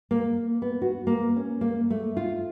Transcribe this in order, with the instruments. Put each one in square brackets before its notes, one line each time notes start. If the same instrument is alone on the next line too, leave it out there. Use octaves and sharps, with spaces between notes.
[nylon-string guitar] A#3
B3
F#4
A#3
C#4
A#3
A3
F4